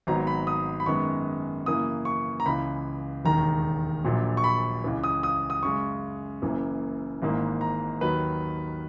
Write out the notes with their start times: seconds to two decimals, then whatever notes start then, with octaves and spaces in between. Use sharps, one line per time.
0.07 G#1 G#2 F#3 B3 A#5
0.27 B5
0.47 D#6
0.80 B5
0.86 F#2 D#3 G#3 B3 C#6
1.66 F#2 C#3 E3 A#3 D#6
2.05 C#6
2.40 A#5
2.46 C#2 C#3 E3 B5
3.25 E1 D#2 D#3 A#5
4.04 A#1 A#2 F#3
4.37 C#6
4.44 B5
4.84 C#2 C#3 E3
5.04 D#6
5.23 D#6
5.50 D#6
5.63 F#2 C#3 G#3 C#6
6.42 F#1 F#2 E3 A#3
7.22 G#1 G#2 E3 A#3
7.61 A#5
8.01 D#2 D#3 F#3 B4